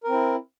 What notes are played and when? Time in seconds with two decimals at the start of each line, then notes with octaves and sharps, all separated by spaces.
0.04 A#4
0.08 C4
0.12 E4